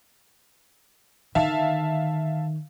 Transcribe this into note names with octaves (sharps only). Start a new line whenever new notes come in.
D3 D#3 E5 F5 A5